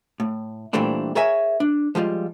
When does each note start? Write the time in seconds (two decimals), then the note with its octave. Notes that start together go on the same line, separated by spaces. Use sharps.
0.20 A2
0.73 A#2 E3 G3 A3 C4 D4
1.15 G#4 A#4 C#5 E5 G#5
1.60 D4
1.95 F3 G3 G#3 F4